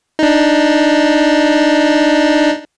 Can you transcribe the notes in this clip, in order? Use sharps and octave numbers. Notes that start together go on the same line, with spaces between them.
D4 D#4